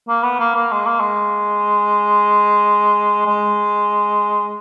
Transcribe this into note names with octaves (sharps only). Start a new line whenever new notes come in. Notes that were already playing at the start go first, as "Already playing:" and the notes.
A#3
B3
A#3
A#3
G#3
A#3
G#3
G#3